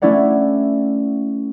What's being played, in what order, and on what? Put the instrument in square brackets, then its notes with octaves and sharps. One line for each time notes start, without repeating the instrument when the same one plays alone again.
[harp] A3 C#4 E4 C#5 D5 F#5